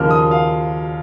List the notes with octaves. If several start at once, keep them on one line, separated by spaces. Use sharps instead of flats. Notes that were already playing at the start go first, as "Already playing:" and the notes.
Already playing: D#2 C#3 F3 A#3 F6
D#6
F5